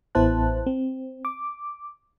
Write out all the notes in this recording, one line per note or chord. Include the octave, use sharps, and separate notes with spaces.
A1 B3 E4 C5 A5 F#6
C4
D6